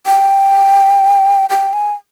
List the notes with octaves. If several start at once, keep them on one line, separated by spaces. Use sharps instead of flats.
G5
G5
G#5